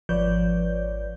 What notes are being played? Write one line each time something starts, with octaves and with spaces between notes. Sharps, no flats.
G#1 F3 B4 C#5 D5 G6